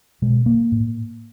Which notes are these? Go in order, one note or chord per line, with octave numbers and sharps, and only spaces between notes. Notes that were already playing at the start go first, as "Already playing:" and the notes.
B2 G#3
A#3
A2